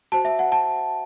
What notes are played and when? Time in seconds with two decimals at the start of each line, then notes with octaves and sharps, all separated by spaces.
0.12 F#4 C5 A5
0.25 E5
0.39 F#5
0.52 A5